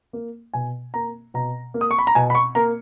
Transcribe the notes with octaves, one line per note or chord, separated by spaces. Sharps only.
A#3
B2 G#5
A#3 A#5
B2 A#5
A#3
D#6
C#6
B5
A#5
B2 G#5
B5
C#6
A#3 A#5